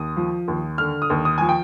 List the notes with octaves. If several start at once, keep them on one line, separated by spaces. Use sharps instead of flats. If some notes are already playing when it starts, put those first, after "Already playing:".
Already playing: D#2 D#6
F3
D#2
D3 F6
D#6
D#2
D#6
F3 G#5
G5